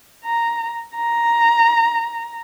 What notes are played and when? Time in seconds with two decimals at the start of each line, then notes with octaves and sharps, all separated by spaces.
0.24 A#5
0.95 A#5